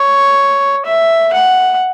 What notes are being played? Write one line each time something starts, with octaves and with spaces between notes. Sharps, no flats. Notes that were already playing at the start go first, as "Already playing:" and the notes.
Already playing: C#5
E5
F#5